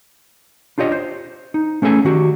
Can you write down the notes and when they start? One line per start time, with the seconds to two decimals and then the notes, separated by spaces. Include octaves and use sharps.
0.78 D4 F4 G4 C#5 D#5
0.92 C5
1.54 D#4
1.82 A3 C#4 G#4 A4 G#5
2.05 D#3 F#4 G4